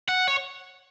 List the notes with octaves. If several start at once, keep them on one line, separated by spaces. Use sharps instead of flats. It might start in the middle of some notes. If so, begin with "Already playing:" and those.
F#5
C#5